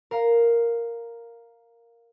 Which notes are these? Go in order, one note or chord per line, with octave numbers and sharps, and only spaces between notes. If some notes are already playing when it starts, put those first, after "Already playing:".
A#4 F5 A#5